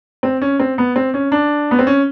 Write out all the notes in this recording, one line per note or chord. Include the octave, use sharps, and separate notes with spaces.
C4
C#4
C4
B3
C4
C#4
D4
B3
C4
C#4